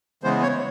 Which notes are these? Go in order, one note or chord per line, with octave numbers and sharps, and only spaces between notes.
C#3 E3 G#3 B3 C5
C#5